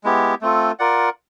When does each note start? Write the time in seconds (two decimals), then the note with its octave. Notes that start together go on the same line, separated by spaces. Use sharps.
0.04 G#3 B3 E4 G4
0.42 A3 C4 F4 A4
0.79 F4 A#4 D5 F#5